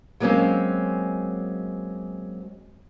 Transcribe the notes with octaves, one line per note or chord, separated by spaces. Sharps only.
F#3 G#3 A#3 C4 C#4